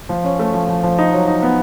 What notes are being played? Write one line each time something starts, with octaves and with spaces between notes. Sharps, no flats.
F3
C#4
A3
F3
F3
F3
D#4
F#3
D#4
B3